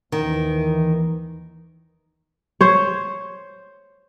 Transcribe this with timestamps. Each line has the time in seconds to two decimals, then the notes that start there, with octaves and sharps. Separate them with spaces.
0.12 D#2 D#3 E3
2.61 C5 C#5